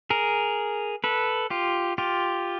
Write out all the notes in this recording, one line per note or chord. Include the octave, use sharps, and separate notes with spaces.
G#4 A#4
A4 B4
F4 G4
F4 G4